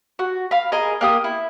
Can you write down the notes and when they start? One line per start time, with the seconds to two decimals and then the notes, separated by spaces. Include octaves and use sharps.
0.19 F#4
0.51 F5 B5
0.72 G#4 A#4 D#5
1.01 A#3 G4 D#6
1.24 E4